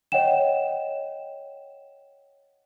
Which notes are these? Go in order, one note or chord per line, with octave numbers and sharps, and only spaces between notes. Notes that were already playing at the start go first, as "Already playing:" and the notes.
C#5 D#5 F#5 G5 E7